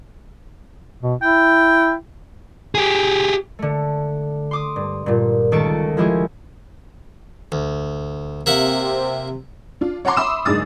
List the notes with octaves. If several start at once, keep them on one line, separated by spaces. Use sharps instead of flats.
B2
E4 G5
G4 G#4
D3 A3
C6 D6 D#6
G2
G2 A#2
C#2 D#3 A4 C#6 A6 D7
F3 G#3 E4 G4 G#4
D2
C3 A#3 E5 F#5
D4 F4
C#5 F#5 A5 A#5 C6 D6
E5 B5 C6 D#6 E6 E7
F#1 G#2 D4 G#4 D#6 A6